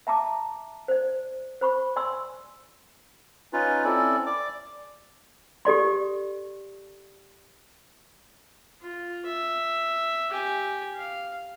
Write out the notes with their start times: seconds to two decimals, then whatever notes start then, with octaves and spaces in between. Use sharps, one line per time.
0.07 E5 A5 A#5 D6
0.88 C5 D5
1.61 C5 B5 C#6
1.96 D5 G#5 C6 E6
3.53 C#4 D#4 F4 B4
3.85 C4 C#4 E4 A4 D5
4.26 D5 D6
5.65 G4 A4 D5 C6
8.82 F4
9.26 E5
10.31 G4 G#5
10.96 F5